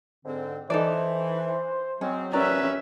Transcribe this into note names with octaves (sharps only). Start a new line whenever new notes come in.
G#2 D3 C4
E3 D#4 A4 C5 D5
F#3 G#3 C4 C#4
D#2 C#4 B4 D5 E5 A#5